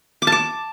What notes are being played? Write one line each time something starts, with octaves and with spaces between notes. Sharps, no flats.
D6
A5
D6